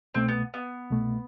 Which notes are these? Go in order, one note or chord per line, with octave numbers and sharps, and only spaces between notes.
C2 B2 A3 C4
B3
B3
C2 B2 A3